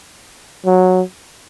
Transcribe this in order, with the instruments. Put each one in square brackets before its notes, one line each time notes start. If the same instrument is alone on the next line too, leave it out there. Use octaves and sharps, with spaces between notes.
[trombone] F#3